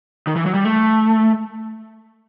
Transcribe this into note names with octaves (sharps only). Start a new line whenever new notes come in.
D#3
E3
F#3
G3
A3